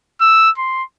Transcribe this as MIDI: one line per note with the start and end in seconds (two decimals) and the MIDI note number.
0.21 0.50 88
0.58 0.83 84